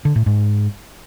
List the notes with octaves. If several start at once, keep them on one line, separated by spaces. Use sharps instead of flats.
D3
A2
G#2